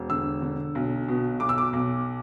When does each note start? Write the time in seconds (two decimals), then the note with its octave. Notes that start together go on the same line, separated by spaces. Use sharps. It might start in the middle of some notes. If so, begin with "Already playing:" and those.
Already playing: E1
0.10 D3 E6
0.42 D3
0.75 B1
1.08 B2
1.40 B1 D6
1.49 E6
1.58 D6
1.73 B1